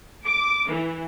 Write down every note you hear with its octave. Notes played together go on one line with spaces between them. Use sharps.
D6
E3